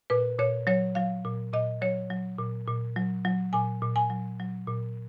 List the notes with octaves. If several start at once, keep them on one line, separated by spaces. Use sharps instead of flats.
A#2 B4
A#2 C#5
F#3 C#5
F#3 F5
A#2
A#2 D#5
F#3 C#5
F#3
A#2
A#2
F#3
F#3
A#2 G#5
A#2
G#5
F#3
F#3
A#2